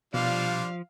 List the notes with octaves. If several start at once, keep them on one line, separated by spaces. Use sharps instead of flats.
B2 F3 G3 D4 F4 F5